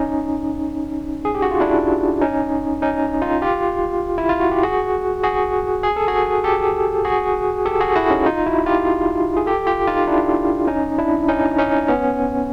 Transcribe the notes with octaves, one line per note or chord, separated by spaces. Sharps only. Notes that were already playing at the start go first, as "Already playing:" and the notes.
Already playing: C#4 D#4
G#4
G4
F#4
F4
D4 E4
C#4 D#4
C#4 D#4
D#4 F4
F4 G4
E4
F4
F#4
G4
F#4 G#4
F#4 G#4
G#4
A4
F#4 G#4
G4 A4
F#4 G#4
G4 A4
F#4 G#4
E4 F#4
C#4 D#4
D#4 F4
E4 F#4
F4 G4
G#4
G4 A4
F4 G4
D#4 F4
D4 E4
C#4 D#4
D4 E4
C#4 D#4
C#4 D#4
B3 C#4